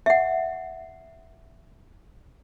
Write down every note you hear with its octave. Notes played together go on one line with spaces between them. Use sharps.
E5 F#5